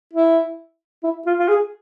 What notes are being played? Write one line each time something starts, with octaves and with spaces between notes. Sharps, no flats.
E4
E4
F4
F4
G#4